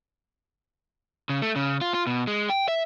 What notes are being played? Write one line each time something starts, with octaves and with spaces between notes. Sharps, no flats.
C#3
A3
C#3
F4
F4
B2
G#3
G5
E5